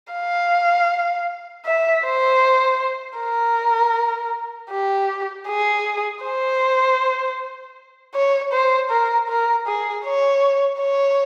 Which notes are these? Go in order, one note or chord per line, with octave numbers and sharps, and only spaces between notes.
F5
E5
C5
A#4
G4
G#4
C5
C#5
C5
A#4
A#4
G#4
C#5
C#5